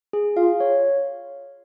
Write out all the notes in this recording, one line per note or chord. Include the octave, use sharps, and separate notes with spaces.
G#4
F4 F5
C#5